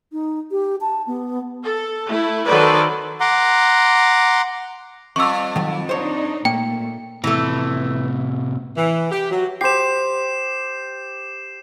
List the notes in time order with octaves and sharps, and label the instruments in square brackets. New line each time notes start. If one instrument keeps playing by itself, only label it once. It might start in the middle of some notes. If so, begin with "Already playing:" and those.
[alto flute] D#4
G4
A5
B3
[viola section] A4
A3 E4
D#3 F#3 A4 B4 C5 D5
[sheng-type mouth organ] F#5 A#5 C6 D6
[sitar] F2 [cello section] G3 [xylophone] C#6 E6
[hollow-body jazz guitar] D#3 F#3
[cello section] D4 D#4 [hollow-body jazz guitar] C5 C#5
[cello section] A#2 A3 [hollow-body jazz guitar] A#3 [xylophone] G5
[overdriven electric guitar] A2 C3 [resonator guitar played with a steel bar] E3 A3
[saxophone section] E3
G4
F#3
[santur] G4 C5 [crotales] C7 E7